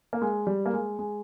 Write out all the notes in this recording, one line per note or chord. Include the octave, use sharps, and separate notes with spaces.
A#3
G#3
G3
A#3
G#3
G#3